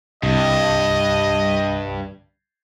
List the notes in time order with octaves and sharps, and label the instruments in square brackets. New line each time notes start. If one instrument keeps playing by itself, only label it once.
[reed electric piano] C2 [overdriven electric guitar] G2 [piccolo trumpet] D#5